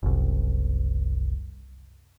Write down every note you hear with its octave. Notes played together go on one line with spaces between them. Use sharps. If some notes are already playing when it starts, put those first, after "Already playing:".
F#1 C2